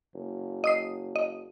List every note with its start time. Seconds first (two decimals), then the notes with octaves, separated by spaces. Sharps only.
0.14 F#1
0.64 D#5 D#6 C7
1.16 D#5